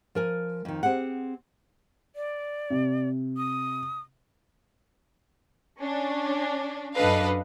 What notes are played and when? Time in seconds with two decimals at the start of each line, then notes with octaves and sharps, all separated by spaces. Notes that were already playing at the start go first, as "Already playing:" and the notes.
0.15 F3 A#4 G#5
0.65 F2 D#3
0.83 C4 G4 G#4 F#5
2.16 D5
2.70 C3
3.37 D#6
5.81 C#4 D4
6.95 F#2 D4 A4 B4 D#5 F5